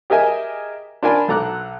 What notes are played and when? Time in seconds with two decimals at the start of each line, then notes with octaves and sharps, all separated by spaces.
0.10 G4 G#4 A#4 D#5 E5 G#5
1.03 D4 F4 A#4 D5 G#5 B5
1.28 B1 A4 A#5 D6 F#6